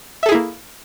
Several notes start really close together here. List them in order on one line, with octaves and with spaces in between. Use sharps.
E5 A4 G#4 E4 A#3